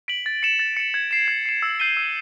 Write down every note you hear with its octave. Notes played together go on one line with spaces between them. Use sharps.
B6 D7 F#7
A6
C#7 E7
A6
C#7 E7
G#6
C7 E7
G#6
C7 E7
E6
G6 C7 D#7 G7
E6